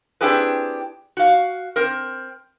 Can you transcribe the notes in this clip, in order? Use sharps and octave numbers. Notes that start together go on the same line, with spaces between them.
C4 D4 E4 G4 G#4 B4
F#4 F5
C4 A#4